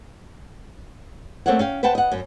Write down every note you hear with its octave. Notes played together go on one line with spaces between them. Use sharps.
A3 A#3 C4 C5 C#5 F#5
C#4 F5 G5
B4 C5 F#5 G5 A5
D#5 F#5
F#2 C#4